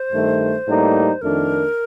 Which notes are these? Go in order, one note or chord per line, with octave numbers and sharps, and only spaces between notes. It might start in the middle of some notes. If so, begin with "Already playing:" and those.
Already playing: C5
G2 D#3 A3
A2 G3 A#3 D#4
F2 D#3 A3 D4 A#4